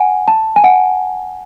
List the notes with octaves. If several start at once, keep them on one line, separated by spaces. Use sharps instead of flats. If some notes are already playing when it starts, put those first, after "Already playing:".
Already playing: F#5 G#5
A5
G#5
F#5